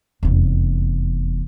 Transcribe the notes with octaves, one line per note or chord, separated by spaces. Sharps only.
F1 E2